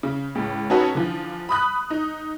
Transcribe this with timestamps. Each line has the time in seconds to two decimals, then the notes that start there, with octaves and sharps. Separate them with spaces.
0.03 C#3
0.35 C#2 A2
0.70 C#4 D#4 F#4 A4 B4
0.95 D3 E3 F3
1.49 B5 D#6 F#6
1.90 D#4